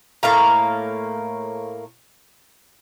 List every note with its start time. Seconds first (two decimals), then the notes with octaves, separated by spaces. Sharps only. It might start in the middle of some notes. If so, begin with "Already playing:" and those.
0.23 A2 A#3 F5 A#5